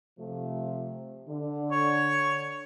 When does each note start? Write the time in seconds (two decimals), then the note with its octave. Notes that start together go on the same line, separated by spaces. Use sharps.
0.18 C3 F3 A3
1.28 D3
1.72 C#5